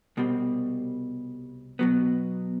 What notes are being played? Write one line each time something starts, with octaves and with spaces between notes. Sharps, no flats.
C2 B2 G3 C4
B2 F#3 B3